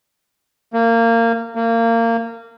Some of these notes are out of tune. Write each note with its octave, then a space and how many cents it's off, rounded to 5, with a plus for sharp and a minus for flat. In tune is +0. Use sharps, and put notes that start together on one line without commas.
A#3 -20
A#3 -25